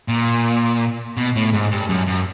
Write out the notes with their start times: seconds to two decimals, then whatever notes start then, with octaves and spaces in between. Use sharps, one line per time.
0.08 A#2
1.17 B2
1.36 A2
1.53 G#2
1.72 G2
1.89 F#2
2.07 F#2